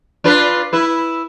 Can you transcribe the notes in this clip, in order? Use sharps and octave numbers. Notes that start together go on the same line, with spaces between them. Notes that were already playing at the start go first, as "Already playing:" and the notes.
D4 F4 B4
E4 B4